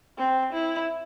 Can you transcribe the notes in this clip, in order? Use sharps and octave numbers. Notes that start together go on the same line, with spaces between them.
C4
E4